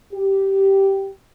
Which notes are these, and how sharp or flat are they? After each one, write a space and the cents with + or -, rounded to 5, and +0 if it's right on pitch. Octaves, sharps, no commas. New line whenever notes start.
G4 -10